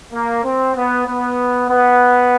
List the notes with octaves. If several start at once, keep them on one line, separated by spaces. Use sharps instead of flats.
A#3
C4
B3
B3
B3